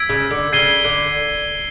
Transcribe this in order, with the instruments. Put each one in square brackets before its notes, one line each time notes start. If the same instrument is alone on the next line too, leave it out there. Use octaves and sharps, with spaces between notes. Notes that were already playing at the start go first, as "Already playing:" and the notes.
Already playing: [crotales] E6 G#6 B6 D7
[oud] C#3
D3
[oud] C#3 [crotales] G#6 C7 D#7 G7
[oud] D3